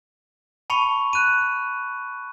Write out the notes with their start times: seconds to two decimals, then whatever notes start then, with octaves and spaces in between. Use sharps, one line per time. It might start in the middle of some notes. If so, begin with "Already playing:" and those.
0.70 A5 B5 C#6 C#7 F7
1.13 F#6 D#7